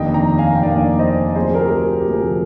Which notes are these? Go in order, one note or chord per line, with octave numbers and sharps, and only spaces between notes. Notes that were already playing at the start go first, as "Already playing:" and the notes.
Already playing: F1 D#2 D#3 A#3 D4 D#5 G5
G5 A#5
F5 G#5
G5
F1 D#2 D#3 A#3 D4 D5 F5
C5 D#5
D2 C3 F3 G#4 C5
G4 A#4
G#4
G4
D2 C3 F3 G#4